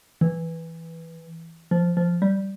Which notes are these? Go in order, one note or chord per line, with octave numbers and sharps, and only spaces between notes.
E3
F3
F3
G3